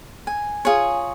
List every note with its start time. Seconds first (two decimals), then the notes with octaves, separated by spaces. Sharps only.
0.27 G#5
0.65 F4 G#4 C#5